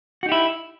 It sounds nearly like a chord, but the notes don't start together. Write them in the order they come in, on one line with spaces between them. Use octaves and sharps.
F#4 D#4 G4 E4